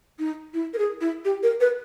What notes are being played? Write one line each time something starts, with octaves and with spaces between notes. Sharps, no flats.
D#4
E4
A#4
G#4
E4
G4
A#4
B4